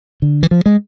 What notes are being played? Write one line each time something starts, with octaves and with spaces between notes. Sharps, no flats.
D3
E3
F3
G#3